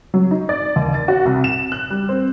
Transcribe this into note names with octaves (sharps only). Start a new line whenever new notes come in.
F#3
D#4
D5
D#2
A6
F#4
C2
E7
F#6
G3
C4